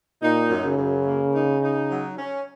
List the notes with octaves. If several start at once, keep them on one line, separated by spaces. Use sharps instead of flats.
A#2 D#4
F#2
C#3
F#2
A#3
D#4
D#4
F#3
C#4